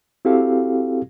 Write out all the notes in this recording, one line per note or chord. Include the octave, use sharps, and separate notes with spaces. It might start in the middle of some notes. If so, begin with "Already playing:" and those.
C4 E4 F#4 G4 A4 F5